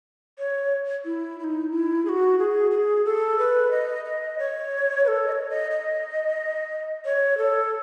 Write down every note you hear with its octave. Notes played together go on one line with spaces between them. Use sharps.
C#5
E4
E4
D#4
E4
G#4
F#4
G#4
G#4
A4
B4
D#5
D#5
C#5
B4
A4
D#5
C#5
D#5
D#5
C#5
A4